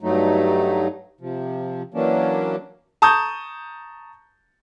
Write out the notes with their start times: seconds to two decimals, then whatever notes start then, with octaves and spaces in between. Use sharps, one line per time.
0.01 G2 F#3 A3 D#4
1.21 C3 F3
1.94 E3 F#3 A#3 C#4 D4
3.02 A5 A#5 C#6 D#6 G6